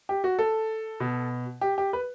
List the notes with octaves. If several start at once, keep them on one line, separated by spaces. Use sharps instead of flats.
G4
F#4
A4
B2
G4
G4
B4